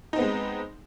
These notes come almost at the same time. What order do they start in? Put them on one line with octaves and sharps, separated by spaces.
D#4 C4 B3 G#3